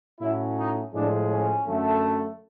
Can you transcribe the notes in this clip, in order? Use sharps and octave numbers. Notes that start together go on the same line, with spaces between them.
A2 F#3 A3 C#4 E4
D#4
A2 F3 G#3 D4
C#4
F#2 D3 F#3 A3